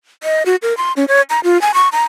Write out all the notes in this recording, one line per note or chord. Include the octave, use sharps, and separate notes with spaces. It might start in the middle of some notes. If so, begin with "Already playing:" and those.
D#5
F#4
A#4
C6
C#4
C#5
A#5
F4
G#5
C#6
A#5